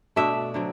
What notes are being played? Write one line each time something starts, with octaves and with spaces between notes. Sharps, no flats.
B2 A3 D4 E5
D3 F#3 C4